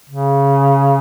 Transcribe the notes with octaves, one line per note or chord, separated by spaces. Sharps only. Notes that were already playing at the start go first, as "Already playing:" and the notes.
C#3